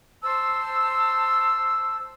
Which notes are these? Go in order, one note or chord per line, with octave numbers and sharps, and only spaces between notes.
C5 A5 E6